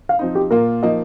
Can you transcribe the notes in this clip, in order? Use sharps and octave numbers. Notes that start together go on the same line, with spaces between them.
F5
F3 C4 D#4
G4
A#2 A#3 F4 A#4
F3 A#3 D#4 D#5